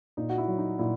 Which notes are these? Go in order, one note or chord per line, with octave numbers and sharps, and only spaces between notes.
A#2 D#4
F#4
E4
F#3
D#4
A#2 E4